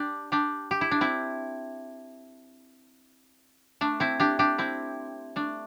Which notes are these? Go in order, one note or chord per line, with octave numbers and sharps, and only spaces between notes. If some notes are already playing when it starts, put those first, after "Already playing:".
Already playing: D4 G4
D4 G4
G4
E4
D4
C4 E4
A3 D4
C4 E4
D4 G4
D4 G4
C4 E4
A3 D4